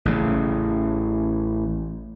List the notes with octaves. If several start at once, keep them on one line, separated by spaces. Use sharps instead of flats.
A1 C#3